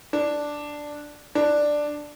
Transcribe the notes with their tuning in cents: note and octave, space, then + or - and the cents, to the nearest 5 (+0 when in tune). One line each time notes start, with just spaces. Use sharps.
D4 +0
D4 +5